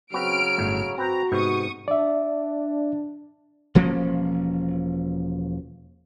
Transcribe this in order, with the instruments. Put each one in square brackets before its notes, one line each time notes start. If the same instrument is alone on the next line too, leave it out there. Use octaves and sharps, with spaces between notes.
[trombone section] C#3 F#3 [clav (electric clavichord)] C4 F#4 B4 [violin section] F6 D7
[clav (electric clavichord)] G1 A2 A3
[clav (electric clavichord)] C4 B4 C5 [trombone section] F#4 [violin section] A#5
[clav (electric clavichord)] G#2 C3 B3 [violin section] C#6 D#6
[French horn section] D4 [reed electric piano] D5 E5
[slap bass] E1 F3 A#3 C#4